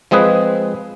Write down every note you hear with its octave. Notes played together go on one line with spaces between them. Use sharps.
F3 G#3 C4 G#4 B4